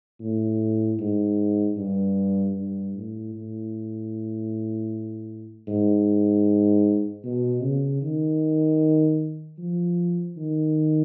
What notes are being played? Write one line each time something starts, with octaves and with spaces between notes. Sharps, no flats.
A2
G#2
G2
G2
A2
A2
G#2
B2
C#3
D#3
F3
D#3